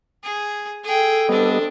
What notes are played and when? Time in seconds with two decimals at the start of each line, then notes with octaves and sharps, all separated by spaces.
0.24 G#4
0.84 G#4 A4 G5
1.29 G3 B3 C4 D4 D#5